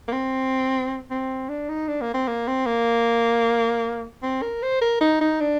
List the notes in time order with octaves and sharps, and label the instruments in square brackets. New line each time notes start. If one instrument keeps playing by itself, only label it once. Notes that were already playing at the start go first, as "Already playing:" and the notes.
[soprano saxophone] A#3
C4
C4
D4
D#4
D4
A#3
C4
A#3
C4
A#3
C4
A#4
C5
A#4
D#4
D#4
D4